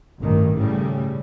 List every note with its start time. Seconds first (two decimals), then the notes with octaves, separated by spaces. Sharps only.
0.20 A1 G2 D#3
0.56 A2 C#3 G3